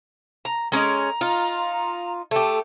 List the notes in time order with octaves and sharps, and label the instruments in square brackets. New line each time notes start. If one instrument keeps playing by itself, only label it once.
[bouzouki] A#5
[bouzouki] G#3 C#4 D#5 [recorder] A#5
[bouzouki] D#4 F4
[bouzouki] A3 G4 [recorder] A4